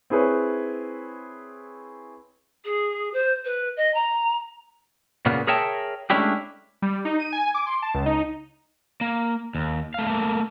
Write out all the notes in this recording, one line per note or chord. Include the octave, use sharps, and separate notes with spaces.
C4 E4 G#4 B4 C#5
G#4
C5
B4
D#5
A#5
A#2 C#3 A#3 B3
G#4 A#4 C#5 E5 G5 A5
G#3 A3 C#4 D4 E4 G4
G3
D#4
D#7
G#5
D6
C6
A5
C#2
D#4
A#3
D#2
A3 F5
A3 A#3